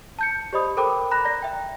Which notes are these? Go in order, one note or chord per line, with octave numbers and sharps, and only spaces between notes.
A5 G6 C#7
G4 C5 D5 D#5 B5 D#6
A4 A#4 C5 G5 B5 D6
A#5 B5 F#6 A#6
D5 A#6
E5 G5 A#5